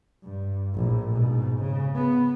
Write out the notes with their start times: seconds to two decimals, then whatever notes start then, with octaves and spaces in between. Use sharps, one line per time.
0.23 G2
0.75 A#1 A2
1.11 G#2 B2
1.60 C#3
1.95 B3